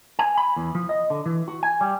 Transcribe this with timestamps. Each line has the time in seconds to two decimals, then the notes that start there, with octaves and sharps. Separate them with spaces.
0.19 G#5
0.38 B5
0.56 E2
0.75 F3
0.89 D#5
1.10 D3
1.26 E3
1.48 F#4
1.63 G#5
1.81 G3